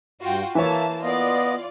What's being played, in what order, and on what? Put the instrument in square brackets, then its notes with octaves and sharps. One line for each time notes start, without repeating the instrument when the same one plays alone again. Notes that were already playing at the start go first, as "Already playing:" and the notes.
[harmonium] G2 [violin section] F4 F#4 G5
[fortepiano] E3 C#5 [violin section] A#3 A5 [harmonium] E5
[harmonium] B3 D#5 [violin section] F4 D5